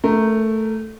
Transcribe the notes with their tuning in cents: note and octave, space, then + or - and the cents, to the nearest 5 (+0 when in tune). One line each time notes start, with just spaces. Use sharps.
A3 +0 A#4 -15